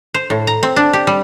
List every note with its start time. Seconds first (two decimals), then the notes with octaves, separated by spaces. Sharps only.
0.14 C5
0.30 A2
0.47 A#5
0.63 C4
0.76 D4
0.93 G4
1.07 G3